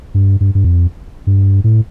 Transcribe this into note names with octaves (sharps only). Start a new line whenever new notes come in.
G2
G2
G2
F2
G2
A2